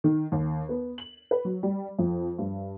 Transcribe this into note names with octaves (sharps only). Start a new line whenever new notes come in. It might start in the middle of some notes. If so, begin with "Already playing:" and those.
D#3
D#2
B3
F#7
B4
F#3
G3
F2
G2